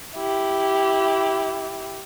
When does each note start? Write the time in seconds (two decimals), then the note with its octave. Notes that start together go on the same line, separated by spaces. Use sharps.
0.15 E4 G4